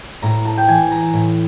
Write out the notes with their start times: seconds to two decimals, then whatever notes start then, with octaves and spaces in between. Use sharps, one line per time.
0.22 A2 A#5
0.45 A5
0.58 G5
0.68 E3 G#5
0.91 A#5
1.14 A2